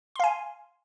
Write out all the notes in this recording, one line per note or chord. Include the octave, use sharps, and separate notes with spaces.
F5 G#5 C6